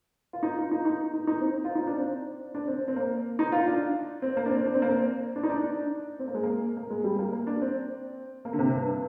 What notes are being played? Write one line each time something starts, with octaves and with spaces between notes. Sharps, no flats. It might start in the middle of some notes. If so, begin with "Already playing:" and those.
F4
D#4
F4
D#4
D#4
D#4
D#4
C4
F4
D#4
D4
C4
D4
C4
C4
A#3
D#4
F4
D4
C4
A#3
D4
C4
D4
C4
A#3
C4
D4
D#4
D4
D4
C4
A#3
G#3
A#3
A#3
G#3
G3
A#3
A#3
D4
C4
A#3
D3
C3
G2